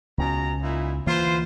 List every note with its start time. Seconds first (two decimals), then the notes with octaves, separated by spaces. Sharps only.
0.18 C#2 B2 C4 C#4 A#5
0.61 A#2 D#4 E4
1.06 D2 E3 A#3 F4 B4 C5